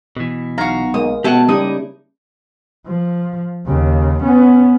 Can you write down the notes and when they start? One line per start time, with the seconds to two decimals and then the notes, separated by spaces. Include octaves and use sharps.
0.17 B2 E3
0.58 B1 F#4 F5 A#5
0.94 G#3 A#3 D#6
1.24 B2 G#3 C4 C#4 G4 E5 F#5 A5
1.49 C#3 G3 A#3 D#4 E4 D#6
2.87 F3
3.66 D#2 C#3
4.23 B3 C#4